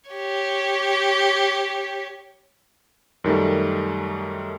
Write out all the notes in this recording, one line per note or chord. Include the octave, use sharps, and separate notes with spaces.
G4 C#5
F#2 D#3 G3 A3